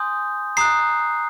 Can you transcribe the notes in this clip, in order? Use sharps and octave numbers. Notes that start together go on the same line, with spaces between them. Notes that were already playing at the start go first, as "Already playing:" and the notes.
Already playing: G#5 C6 D#6 G6
A#5 D#6 F#6 C7